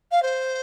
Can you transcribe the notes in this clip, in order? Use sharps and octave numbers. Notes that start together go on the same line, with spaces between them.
F5
C5